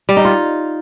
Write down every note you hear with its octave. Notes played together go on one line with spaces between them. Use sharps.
G3
D#4
F4